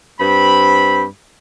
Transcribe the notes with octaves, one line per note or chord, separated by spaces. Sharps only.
G2 C4 B5